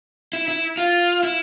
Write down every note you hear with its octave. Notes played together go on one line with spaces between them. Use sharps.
E4
E4
F4
E4